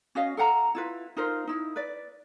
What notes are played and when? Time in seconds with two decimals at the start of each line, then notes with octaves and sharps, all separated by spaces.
0.15 C#4 F#4 D#5 F5
0.37 A4 F5 F#5 A#5
0.75 E4 F4 B4
1.17 D#4 F4 A#4 C5
1.47 D#4 E4
1.76 B4 D5